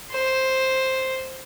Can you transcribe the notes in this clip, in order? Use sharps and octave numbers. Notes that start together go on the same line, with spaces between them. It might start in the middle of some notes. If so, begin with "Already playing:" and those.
C5